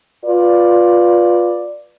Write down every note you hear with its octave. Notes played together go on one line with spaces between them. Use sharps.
F4 B4 D5